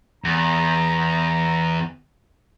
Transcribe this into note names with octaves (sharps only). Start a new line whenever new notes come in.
E2 A#5